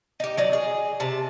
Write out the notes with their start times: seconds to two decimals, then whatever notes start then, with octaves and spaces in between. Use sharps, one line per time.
0.20 D#4 G4
0.37 F#3 D#4 D5
0.53 G#4
1.00 C3 A5